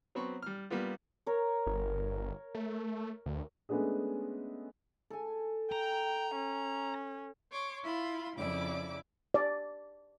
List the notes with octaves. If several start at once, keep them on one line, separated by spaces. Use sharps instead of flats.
F#3 B3 C4 B5 C#6
G3 F6
G3 A#3 B3 F4
A#4 C#5
G1
A3
D2
G#3 A3 B3 C#4 D4 G#4
A4 G#5
G5 A#5
C#4
C#5 C6 D6
E4 F4 B5 C6
F2 C#3 E4 D5 D6
D5